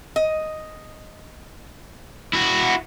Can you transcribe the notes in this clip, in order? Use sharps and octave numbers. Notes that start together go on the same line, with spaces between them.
D#5
E4 F#4